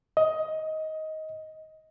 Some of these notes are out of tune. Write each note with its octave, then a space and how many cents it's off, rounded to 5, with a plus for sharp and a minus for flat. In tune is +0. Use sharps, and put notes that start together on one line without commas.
D#5 +15